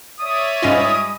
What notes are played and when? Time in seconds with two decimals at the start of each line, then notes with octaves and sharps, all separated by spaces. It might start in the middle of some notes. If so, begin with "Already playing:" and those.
0.20 C#5 D5 E5 D#6
0.62 G#2 G3 C#4 F4 D#5